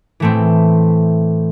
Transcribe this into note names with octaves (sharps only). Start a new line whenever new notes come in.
A2 E3 A3 C4